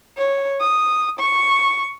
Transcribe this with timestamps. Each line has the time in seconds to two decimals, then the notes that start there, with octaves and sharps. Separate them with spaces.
0.17 C#5
0.61 D#6
1.19 C#6